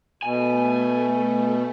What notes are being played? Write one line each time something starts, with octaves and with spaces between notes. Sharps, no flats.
B2 A3 G#5